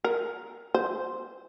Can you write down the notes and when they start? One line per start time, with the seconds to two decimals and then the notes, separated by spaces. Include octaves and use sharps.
0.04 A#4
0.74 C5